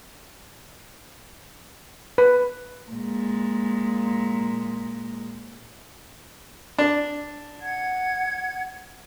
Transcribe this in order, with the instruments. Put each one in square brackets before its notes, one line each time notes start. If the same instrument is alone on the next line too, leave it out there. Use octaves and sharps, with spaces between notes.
[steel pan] B4
[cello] A#2 G#3
[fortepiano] D4
[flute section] F#5 G#6